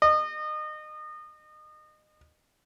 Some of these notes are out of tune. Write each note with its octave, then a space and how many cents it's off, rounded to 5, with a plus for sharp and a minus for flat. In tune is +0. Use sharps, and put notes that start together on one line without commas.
D#5 -30